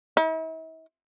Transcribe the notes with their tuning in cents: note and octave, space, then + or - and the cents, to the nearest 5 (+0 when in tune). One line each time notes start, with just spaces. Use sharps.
E4 -45